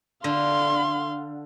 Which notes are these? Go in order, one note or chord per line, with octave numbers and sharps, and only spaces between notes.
D3 F5 C6